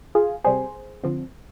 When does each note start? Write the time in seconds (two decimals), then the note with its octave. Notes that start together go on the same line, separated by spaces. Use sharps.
0.15 F4 G#4
0.44 C3 G3 C4 G#4 C5
1.04 D3 F3 C4